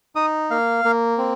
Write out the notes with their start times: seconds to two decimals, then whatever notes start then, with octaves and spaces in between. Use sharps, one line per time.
0.16 D#4 D#6
0.51 A#3 F5
0.85 A#3
1.18 C4